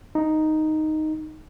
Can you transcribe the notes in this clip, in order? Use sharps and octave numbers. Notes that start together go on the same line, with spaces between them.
D#4